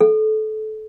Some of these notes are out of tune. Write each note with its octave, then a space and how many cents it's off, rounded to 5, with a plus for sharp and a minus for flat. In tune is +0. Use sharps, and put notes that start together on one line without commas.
A4 -25